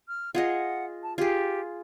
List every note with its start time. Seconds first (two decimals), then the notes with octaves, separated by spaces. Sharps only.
0.08 F6
0.35 F4 G#4 D#5 F#5
1.03 A5
1.18 F4 G4 G#4